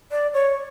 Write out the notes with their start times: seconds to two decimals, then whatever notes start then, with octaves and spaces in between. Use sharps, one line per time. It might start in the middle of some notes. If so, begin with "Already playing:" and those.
0.11 D5
0.34 C#5